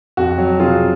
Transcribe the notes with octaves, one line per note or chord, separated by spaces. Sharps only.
F2 F#4
F#3
C3 F4 G#4